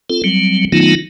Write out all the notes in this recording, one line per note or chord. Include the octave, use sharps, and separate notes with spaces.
C4 F4 A4
F#3 G3 C4
D#3 F#3 A3 B3 D#4 F4